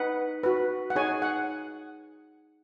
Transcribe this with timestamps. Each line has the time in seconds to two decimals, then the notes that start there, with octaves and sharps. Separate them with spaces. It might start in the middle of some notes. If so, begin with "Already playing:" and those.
Already playing: D#4 B4 F#5
0.43 F#4 B4
0.90 F#5
0.96 D#4 G#4 C#5 G#5
1.22 F#5